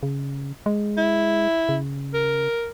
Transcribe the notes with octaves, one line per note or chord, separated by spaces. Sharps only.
C#3
G#3
E4
C#3
A#4